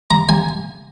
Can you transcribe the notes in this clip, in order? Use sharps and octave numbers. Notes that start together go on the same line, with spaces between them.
A#5
G#5